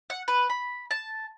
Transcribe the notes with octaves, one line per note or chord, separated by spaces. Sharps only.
F#5
B4
B5
A5